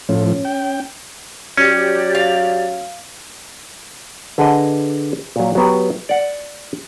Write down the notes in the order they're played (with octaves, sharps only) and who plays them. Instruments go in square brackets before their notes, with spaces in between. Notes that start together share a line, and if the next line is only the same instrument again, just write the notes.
[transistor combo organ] A2 F3 [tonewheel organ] C#4
[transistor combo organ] G5
[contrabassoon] F#3 [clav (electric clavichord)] C#4 [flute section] G4 D5
[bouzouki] F5
[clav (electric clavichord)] D3 G#4 B4 D#5
A#2 F#3
F#3 B3 G4
D5 F#5